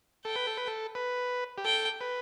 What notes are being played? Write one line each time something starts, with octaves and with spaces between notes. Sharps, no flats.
A4 G5
B4
A4
B4
A4
B4
G4
A4 G5
B4